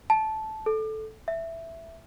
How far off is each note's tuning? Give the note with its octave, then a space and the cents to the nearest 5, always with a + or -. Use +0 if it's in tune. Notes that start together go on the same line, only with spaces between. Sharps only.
A5 -15
A4 -10
E5 +5